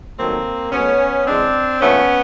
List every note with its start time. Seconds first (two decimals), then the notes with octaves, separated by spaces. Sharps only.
0.18 G2 D#3 F#3 A3 A#3 C4
0.72 B2 F#3 A3 B3 C#4
1.27 C#3 E3 G#3 C4 D4
1.81 A#2 F3 A3 B3 C#4